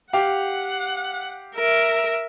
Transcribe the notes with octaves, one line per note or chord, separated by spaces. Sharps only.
G4 F5 F#5
A#4 E5